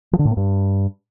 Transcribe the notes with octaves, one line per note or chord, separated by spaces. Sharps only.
F3
D3
A2
A#3
G2